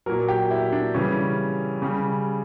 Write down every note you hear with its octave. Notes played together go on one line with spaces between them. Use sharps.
A#2 F#3 A#4
G4
E4
D4
C#3 E3 G3 C#4
C#3 G3